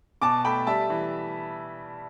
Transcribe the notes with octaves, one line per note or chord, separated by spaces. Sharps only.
B2 A5 D6
A3 G5 B5
G3 E5 A5
E3